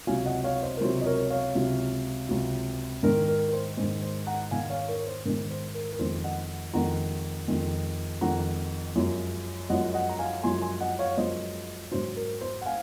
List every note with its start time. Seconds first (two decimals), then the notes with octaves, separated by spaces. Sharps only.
0.07 C#2 C3 F#3 F5 G#5
0.26 D#5 F#5
0.44 C#5 F5
0.62 C5 D#5
0.77 A#4
0.81 C#2 C3 F#3 C5
1.01 D#5
1.06 A#4 C#5
1.30 C#5 F5
1.55 C#2 C3 F#3
2.29 C#2 C3 F#3
3.03 G#2 D#3 G#3 A#4
3.28 A#4
3.48 A#4
3.53 C5
3.77 G#2 D#3 G#3 C5
4.02 C5
4.27 F#5 A#5
4.51 G#2 D#3 G#3 F5 G#5
4.70 C#5 F5
4.88 A#4 C#5
5.06 C5
5.25 G#2 D#3 G#3 A#4
5.50 C5
5.75 A#4
5.92 A#4
5.99 F2 D#3 G#3 C5
6.24 D#5 F#5
6.74 F2 D#3 G#3 F#5 A#5
7.48 F2 D#3 G#3
8.21 F2 D#3 G#3 F#5 A#5
8.96 F#2 F3 G#3
9.69 F#2 F3 G#3 D#5 F#5
9.94 D#5 F#5
10.09 A#5
10.19 F5 G#5
10.43 F#2 F3 G#3 G#5 C6
10.62 G#5 C6
10.80 D#5 F#5
10.99 C#5 F5
11.17 F#2 F3 G#3 C5 D#5
11.91 G#2 F#3 C5
12.16 A#4
12.41 C5
12.61 F#5
12.66 F5 G#5